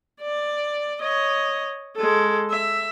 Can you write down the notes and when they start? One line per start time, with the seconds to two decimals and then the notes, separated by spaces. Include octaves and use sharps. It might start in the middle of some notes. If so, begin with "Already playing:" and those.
0.21 D5
1.02 C#5 D#5
1.96 G#3 A4
2.50 E5